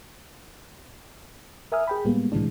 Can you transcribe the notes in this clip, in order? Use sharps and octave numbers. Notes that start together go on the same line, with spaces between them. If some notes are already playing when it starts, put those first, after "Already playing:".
A#4 E5 G#5 D#6 F6
G#4 G5 B5
A2 G3 G#3 A#3 B3
A2 C3 E3 G#3 D4